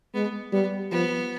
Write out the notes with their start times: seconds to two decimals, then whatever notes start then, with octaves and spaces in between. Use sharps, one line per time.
0.14 G#3 B3
0.53 G3 B3
0.91 F3 B3